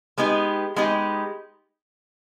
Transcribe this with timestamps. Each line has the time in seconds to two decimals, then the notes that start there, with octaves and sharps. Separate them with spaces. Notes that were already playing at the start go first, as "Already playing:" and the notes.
0.18 G#3 B3 D#4 G4
0.76 G#3 B3 D#4 G4